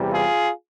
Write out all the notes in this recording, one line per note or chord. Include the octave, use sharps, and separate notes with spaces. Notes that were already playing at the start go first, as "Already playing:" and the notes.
Already playing: E2 C3 E3 G3
F4 G#4